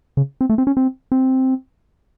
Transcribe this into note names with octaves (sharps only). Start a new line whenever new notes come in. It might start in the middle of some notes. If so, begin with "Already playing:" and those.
C#3
C4
A3
C4
C#4
C4
C4